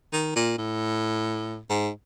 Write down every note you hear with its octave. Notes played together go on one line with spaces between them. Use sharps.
D#3
A#2
A2
G#2